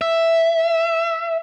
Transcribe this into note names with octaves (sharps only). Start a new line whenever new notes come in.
E5